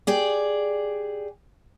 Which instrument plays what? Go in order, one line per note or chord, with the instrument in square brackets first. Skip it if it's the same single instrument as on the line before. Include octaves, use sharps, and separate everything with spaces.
[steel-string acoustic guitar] G4 G#4 D5